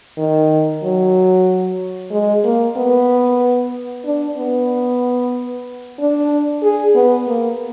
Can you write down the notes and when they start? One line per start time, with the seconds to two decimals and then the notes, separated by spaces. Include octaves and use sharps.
0.18 D#3
0.83 F#3
2.11 G#3
2.44 A#3
2.77 B3
4.05 D4
4.38 B3
5.99 D4
6.63 G#4
6.95 B3
7.27 A#3